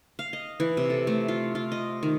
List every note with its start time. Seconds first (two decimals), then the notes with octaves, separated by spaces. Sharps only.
0.19 F5
0.33 D#5
0.60 E3
0.77 C3
0.90 A4
1.07 A3
1.28 F4
1.55 F4
1.72 D#5
2.03 D#3